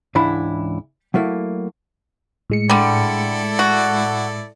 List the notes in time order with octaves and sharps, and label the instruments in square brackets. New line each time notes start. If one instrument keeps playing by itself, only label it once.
[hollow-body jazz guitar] C#2 G#2 E3 D4 E4 B5
F#3 A3 A#3 E4
[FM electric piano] A2 G#3 C#7
[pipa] D3 G3 [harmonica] E4 A4 D5
[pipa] F#4